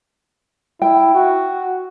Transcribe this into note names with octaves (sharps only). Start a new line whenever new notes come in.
E4 G5
F#4